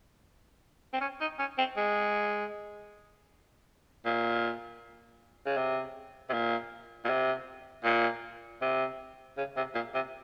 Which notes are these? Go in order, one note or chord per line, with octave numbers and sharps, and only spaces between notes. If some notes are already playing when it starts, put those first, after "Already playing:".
C4
C#4
D#4
C#4
C4
G#3
A#2
C#3
C3
C3
A#2
A#2
C3
A#2
C3
C#3
C3
A#2
C3